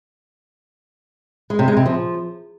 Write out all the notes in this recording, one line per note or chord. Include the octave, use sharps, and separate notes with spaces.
G#3
C3
G#3
C3
F3